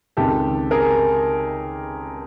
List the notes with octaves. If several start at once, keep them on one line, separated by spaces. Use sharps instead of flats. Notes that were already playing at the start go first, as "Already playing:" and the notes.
C#2 C3 D#3 G4 A4
G#4 A#4